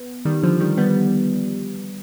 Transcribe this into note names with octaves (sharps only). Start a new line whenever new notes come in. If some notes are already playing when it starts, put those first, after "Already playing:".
Already playing: B3
D#3 G3
D3 F3
D#3 G3
G3 B3